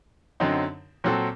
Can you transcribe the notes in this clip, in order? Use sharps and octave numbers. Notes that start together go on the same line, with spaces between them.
F#2 D3 F#3 C4 D#4
A#2 F#3 C4 F#4 A4